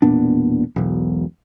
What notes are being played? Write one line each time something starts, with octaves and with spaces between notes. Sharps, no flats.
E1 A#2 B3 D4
E1 B1